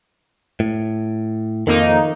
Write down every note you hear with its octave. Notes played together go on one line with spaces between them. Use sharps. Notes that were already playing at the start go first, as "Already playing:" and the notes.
A2
F2 D#3 A#3 D#4